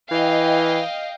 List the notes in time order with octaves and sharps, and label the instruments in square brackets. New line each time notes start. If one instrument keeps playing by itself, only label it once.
[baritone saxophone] E3 [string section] D#5 F5 G5